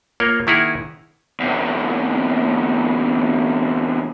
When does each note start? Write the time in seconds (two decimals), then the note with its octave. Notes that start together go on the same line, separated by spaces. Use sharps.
0.20 A#3 F4 A#4 C#5
0.47 D#3 A#3 E4 G#4 A#4 F#5
1.40 E2 C3